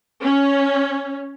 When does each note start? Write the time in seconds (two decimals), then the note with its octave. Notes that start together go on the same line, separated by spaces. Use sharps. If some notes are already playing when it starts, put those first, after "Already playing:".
0.23 C#4